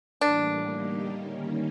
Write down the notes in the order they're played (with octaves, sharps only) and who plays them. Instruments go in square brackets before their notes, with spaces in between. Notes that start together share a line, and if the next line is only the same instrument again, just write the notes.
[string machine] A2 E3 G3 A#3 [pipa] D4
[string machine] D3 G3 A#3 D#4 G4
D#3 G3 A#3 C#4